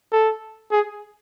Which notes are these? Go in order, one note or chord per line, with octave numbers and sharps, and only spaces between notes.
A4
G#4